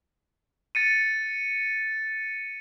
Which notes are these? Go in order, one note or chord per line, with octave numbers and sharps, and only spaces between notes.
A6 C#7 D#7